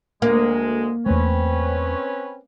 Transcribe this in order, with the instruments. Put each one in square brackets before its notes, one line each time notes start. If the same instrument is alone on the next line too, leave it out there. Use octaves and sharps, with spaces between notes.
[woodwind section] D2 G#3 [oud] A#3
[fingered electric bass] E2 A3 [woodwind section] C4 C#4 B4